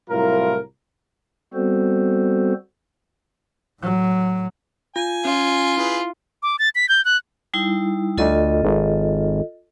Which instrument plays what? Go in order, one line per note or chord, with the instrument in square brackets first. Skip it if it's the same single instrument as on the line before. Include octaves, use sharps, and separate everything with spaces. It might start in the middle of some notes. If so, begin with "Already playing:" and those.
[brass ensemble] C2 A2 F#3 F4 A#4
[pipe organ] G3 B3 C4 F#4 A4 C5
[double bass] A2 F#3
[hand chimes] F4 [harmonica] G#5
[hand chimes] C#4 [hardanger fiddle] F4
[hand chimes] E4 [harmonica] G#4 B4
[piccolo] D6
A6
B6
G6
F#6
[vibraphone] G3 D#4 E4
[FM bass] D2 [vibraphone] F4 A4 D#5
[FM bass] G#1